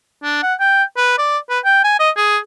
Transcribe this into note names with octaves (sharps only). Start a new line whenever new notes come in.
D4
F#5
G5
B4
D5
B4
G5
G#5
D#5
G#4